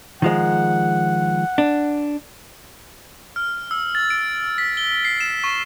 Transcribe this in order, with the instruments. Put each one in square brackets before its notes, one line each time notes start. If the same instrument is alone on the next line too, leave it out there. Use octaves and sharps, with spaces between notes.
[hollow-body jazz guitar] D#3 F3 G#3 [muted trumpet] F#5
[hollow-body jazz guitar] D4
[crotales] F6
E6
A6
D7
B6
G7
C7
E7
C#6